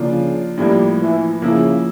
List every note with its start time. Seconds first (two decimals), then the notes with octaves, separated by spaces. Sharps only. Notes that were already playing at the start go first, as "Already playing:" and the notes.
Already playing: C#3 F3 A#3 D4 F4
0.58 A2 F3 G3 A#3
1.00 E3
1.42 C#3 F3 A#3 E4